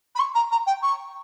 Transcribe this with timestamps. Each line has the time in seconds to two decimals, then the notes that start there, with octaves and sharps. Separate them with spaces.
0.15 B5
0.19 C#6
0.34 A#5
0.51 A#5
0.66 G5
0.82 C#6